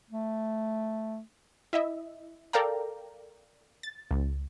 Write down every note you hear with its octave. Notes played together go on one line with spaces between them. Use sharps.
A3
E4 D#5 E5
A4 A#4 D5 F5 G5 A#5
A6
C#2